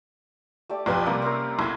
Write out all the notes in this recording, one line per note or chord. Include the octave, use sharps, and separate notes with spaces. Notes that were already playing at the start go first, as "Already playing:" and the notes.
A3 G4 D5
B1 F2 F4 G4 A4 B4
C3 G3 A#3
C4 C#4 A#4
B1 E4 A4 G#6